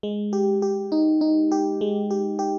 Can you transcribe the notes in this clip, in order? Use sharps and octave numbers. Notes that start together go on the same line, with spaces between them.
G#3
G4
G4
D#4
D#4
G4
G#3
G4
G4